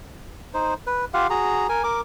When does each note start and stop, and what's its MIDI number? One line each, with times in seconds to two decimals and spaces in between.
0.54 0.74 63
0.54 0.74 72
0.87 1.05 71
1.14 1.27 65
1.14 1.27 67
1.14 1.27 77
1.14 1.27 78
1.30 1.67 66
1.30 1.67 68
1.30 1.67 82
1.69 1.83 70
1.69 1.83 80
1.84 2.01 70
1.84 2.01 86